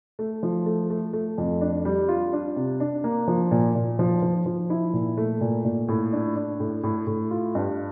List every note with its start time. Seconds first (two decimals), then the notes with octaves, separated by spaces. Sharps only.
0.19 A3
0.43 F3
0.66 A3
0.90 A3
1.13 A3
1.38 F2
1.61 D4
1.85 G3
2.08 F4
2.33 D4
2.56 C3
2.80 D4
3.04 A#3
3.28 F3
3.51 A#2
3.75 A#2
3.99 F3
4.22 F3
4.46 F3
4.70 E4
4.93 A#2
5.17 A3
5.41 A#2
5.65 A#2
5.88 A2
6.12 D4
6.36 D4
6.60 A2
6.83 A2
7.07 A2
7.31 F4
7.55 G2